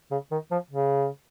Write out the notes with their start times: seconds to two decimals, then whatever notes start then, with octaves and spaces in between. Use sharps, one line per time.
0.11 C#3
0.31 D#3
0.51 F3
0.71 C#3